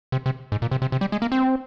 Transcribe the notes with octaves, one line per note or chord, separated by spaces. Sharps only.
C3
C3
G#2
A#2
C3
C3
C3
G3
G#3
A#3
C4